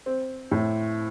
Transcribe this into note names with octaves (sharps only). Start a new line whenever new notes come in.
C4
A2